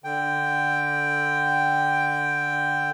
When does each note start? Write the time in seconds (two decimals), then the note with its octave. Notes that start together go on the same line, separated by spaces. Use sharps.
0.04 D3 G5